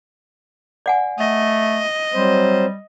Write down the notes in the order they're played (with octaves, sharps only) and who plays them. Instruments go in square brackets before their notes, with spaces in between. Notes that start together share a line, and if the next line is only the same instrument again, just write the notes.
[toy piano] D5 F#5 G#5
[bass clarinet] A3 [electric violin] D#5
[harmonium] F#3 C4 C5 [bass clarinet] G3